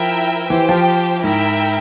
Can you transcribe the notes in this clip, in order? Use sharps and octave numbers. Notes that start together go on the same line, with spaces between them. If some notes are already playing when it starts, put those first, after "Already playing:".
Already playing: F3 E4 A#4 E5 G5
E3 G4 C5 G5
F3
G#2 E4 A#4 E5 G5